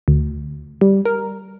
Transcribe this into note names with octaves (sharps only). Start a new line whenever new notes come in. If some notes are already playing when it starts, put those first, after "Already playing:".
D2
G3
A#4